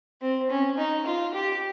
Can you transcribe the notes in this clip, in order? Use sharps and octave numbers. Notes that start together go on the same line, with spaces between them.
C4
C#4
D#4
F4
G4